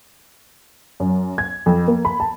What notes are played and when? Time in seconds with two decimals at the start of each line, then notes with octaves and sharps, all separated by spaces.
1.00 F#2
1.38 G#6
1.66 F2
1.88 A#3
2.05 B5
2.20 A5